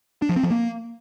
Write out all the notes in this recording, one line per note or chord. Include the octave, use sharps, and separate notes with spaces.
D4
F3
C4
F3
A#3